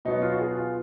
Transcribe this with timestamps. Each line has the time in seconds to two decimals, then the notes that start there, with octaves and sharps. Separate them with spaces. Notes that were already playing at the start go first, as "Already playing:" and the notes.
0.05 B2 F#3 B3 D#4
0.22 F4
0.32 F#4
0.39 G#4
0.57 F4